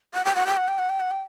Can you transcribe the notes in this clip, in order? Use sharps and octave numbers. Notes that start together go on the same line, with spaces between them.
F#5
G5
F#5
G5
F#5
G5
F#5
G5
F#5
G5